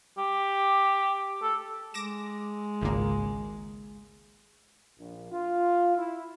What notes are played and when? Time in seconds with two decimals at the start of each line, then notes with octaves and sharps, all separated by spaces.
0.18 G4
1.42 A4
1.94 G#3 D6 A#6 E7
2.82 G#1 C#2 A#3
4.98 A#1
5.32 F4
5.97 E4